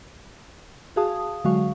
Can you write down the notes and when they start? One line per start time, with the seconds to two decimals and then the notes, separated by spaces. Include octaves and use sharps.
0.96 F#4 G#4 F5 A5 D#6
1.44 D3 F#3 G#3 F#4 F5 C#6